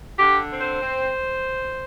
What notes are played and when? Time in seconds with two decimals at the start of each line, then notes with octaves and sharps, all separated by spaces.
0.19 D3 G4
0.51 C4
0.61 C5
0.82 C4